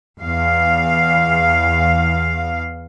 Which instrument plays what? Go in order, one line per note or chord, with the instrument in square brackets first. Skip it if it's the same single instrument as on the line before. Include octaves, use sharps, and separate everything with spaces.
[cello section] E2 F5